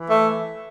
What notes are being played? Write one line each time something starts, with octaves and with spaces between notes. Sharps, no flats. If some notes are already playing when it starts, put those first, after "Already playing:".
Already playing: E3
A3